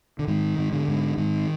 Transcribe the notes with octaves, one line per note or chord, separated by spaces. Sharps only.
D3
G#2 D#3
G#2
D3
G#2
G#2 D#3